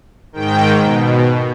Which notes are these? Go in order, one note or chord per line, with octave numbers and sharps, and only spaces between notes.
G#2 D#3 G5
B2